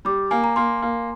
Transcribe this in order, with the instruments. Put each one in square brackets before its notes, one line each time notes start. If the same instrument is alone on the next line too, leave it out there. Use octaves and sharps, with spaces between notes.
[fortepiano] G3 [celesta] D6
[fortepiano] A#3 [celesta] G#5
[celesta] A#5
[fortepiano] A#3 [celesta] C6
[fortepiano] A#3